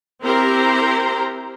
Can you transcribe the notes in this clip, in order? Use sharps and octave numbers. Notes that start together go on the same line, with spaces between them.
C4 E4 G4 A#4 C5 A#5